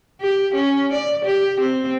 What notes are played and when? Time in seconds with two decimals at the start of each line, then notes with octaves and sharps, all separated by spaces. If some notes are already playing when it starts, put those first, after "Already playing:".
0.21 G4
0.55 C#4
0.93 D5
1.25 G4
1.60 C4